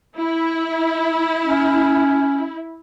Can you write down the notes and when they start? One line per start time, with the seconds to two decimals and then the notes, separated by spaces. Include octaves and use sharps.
0.19 E4
1.44 C#4